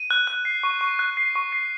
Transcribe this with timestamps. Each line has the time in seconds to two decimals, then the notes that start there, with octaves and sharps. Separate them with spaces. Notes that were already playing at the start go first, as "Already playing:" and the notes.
Already playing: D#7
0.11 F#6
0.27 F#6
0.45 C7
0.63 C#6
0.81 C#6
0.99 F#6
1.17 C7
1.35 C#6
1.52 C7